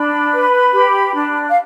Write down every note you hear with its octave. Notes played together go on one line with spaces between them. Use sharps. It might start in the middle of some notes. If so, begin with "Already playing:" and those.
Already playing: D4 B5
B4
G4
D4
F5